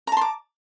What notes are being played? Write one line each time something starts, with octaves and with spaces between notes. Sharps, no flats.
A5 A#5 C6 D6